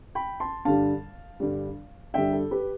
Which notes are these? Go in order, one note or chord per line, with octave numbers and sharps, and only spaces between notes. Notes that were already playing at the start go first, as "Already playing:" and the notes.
G5 B5
A5 C6
G2 D3 G3 F5 A5
G2 D3 G3
G2 D3 G3 E5 G5
A4
G4 B4